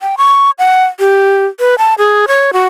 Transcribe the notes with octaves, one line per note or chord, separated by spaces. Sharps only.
G5
C#6
F#5
G4
B4
A5
G#4
C#5
F#4